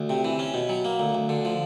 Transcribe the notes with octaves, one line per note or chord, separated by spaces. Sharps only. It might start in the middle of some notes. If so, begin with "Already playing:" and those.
Already playing: D2
C3
E3
C#4
B2
F#3
A#3
D2
D2
D3
F3